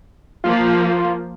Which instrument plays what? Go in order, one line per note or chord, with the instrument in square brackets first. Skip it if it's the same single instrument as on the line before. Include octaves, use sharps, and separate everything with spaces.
[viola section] F3 A#3 [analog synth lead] F4